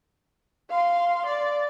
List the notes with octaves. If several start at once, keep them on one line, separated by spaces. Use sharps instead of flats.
F5 C6
D5